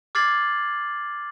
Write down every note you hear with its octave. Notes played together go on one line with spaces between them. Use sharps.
D6 F6 G#6 A6 C7 F#7